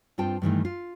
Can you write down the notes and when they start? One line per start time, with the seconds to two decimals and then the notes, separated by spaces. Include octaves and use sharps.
0.18 G2 C4 F4 G5 A5
0.42 G2 D#3 E3 A3
0.65 F4